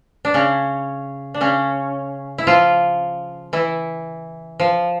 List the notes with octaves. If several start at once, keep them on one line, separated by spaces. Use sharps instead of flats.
D4
C#3 C#4
D4
C#3 C#4
E4
F3 F4
E3 E4
F3